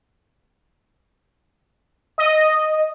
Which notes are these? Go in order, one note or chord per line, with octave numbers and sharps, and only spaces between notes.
D#5